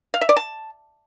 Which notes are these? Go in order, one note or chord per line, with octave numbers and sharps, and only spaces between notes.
F5
E5
D5
A5